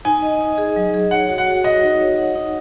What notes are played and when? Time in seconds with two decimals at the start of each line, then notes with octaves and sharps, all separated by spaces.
0.05 D#4 G#5
0.22 D#5
0.41 D#4
0.58 G#4
0.76 F#3
0.94 G#4
1.11 C#5 F#5
1.29 F#4
1.38 F#5
1.47 F#4
1.64 D#5 F#5
1.83 D#4
2.00 C#5
2.18 F#5
2.35 D#4